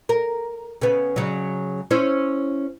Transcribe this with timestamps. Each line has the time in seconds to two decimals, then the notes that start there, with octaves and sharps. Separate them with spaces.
0.09 A#4
0.81 C#3 B3
1.16 C#3 F#3
1.91 C#4 E4 C5